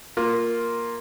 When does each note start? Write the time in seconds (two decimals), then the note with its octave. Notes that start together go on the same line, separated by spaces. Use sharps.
0.17 A#3 F4